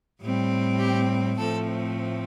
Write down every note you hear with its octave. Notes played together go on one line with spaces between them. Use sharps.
A2 G3 C4
G4
A2 F3 A3 C4 A4